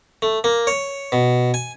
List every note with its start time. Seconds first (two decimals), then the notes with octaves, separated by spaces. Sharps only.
0.22 A3
0.44 A#3
0.67 C#5
1.12 B2
1.54 G#5